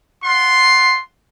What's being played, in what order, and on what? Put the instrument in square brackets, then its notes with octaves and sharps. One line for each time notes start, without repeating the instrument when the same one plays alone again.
[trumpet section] F4 F#5 C6